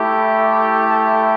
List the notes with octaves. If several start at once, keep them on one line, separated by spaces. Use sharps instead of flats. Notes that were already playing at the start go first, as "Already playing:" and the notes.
Already playing: A3 E4 G4
A5